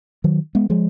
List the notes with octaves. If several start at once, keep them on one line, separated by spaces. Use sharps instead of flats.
D#3 F#3
G#3 B3
F3 G#3